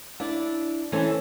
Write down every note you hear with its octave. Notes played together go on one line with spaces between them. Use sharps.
D4 E4 D5
E3 C#4 A4 C5